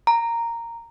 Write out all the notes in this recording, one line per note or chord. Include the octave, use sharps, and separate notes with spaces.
A#5